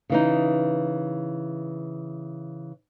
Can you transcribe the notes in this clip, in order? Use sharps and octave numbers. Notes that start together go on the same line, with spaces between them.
C#3 E3 D#4